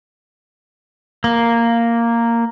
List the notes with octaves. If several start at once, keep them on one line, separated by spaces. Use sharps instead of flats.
A#3